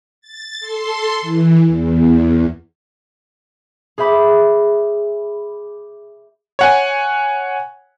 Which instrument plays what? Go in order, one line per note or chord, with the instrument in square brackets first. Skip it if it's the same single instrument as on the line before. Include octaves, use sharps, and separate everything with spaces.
[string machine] A6
A4 C6
E3
E2
[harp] G#4 C5 E5 B5 D6
[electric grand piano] C#5 F#5 G#5